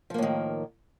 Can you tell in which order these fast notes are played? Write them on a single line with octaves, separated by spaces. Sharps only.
F3 A#3 A2 D#3